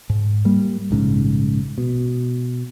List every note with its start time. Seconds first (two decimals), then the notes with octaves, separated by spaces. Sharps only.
0.10 G#2
0.45 G3 A#3
0.91 A#1 G#2 C#3
1.78 B2